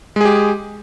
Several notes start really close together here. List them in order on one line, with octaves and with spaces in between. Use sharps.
G#3 G#4 G4